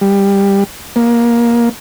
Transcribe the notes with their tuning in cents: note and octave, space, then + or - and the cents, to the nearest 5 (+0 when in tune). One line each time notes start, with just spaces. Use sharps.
G3 +15
A#3 +15